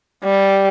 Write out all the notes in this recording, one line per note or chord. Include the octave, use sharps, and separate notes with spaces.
G3